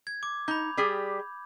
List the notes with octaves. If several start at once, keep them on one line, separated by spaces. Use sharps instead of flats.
G#6
D6
D#4 B5 G6
G3 G4 G#4